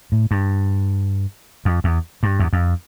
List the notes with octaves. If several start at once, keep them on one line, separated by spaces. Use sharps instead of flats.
A2
G2
F2
E2
G2
E2
F2